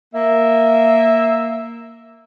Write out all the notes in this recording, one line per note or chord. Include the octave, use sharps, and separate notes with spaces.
A#3 E5